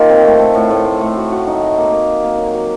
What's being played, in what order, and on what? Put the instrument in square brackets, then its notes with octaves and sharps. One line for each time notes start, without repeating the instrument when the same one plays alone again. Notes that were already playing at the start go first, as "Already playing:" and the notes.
Already playing: [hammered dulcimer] D#3 A#3 F4
C4
A3
A3
A2
A2
A2
A3
F#4
F#4
D#4
F#4
A#3
A#3
F#4
A#3
F#3
F#3